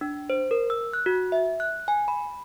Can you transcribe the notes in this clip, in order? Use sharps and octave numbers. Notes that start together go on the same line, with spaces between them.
D4
C5
A#4
E6
F#6
F#4
E5
F#6
G#5
B5